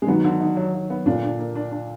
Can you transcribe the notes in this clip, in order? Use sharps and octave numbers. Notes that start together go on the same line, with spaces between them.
G#3
D#3 F#3 B3
D3
D#4
F#3
F#3
B3
A#2 D3 D4
D4
A#3
D4
D4